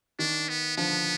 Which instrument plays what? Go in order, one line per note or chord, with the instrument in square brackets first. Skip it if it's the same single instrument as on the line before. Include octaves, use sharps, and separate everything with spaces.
[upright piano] D#3 [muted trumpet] D4
[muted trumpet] B3
[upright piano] D3 F3 [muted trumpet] B3